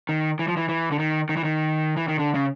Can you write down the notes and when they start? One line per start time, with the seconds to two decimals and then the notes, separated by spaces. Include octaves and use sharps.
0.09 D#3
0.39 E3
0.48 F3
0.57 E3
0.69 E3
0.92 D3
0.99 D#3
1.29 D#3
1.37 E3
1.44 D#3
1.97 E3
2.08 D#3
2.19 D3
2.34 C#3